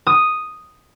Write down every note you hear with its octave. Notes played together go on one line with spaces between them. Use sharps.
D#6